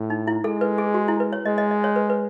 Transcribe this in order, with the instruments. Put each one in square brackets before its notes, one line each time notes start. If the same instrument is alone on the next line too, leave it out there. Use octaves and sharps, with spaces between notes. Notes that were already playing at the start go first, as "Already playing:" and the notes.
Already playing: [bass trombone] A2
[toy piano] D#4
E4
[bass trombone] G#3 [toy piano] A4
[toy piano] B4
G#4
F#4
E4
B4
C#5
[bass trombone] G#3 [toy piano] D#5
[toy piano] D#5
D#5
C#5
B4
B4